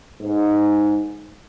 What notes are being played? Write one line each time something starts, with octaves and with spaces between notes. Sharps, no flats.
G#2